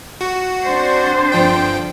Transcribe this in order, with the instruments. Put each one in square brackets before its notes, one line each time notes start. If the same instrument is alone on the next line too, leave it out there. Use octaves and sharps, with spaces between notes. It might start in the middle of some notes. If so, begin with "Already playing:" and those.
[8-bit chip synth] F#4
[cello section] C4 D4 C5
[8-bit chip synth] G1 F3 G5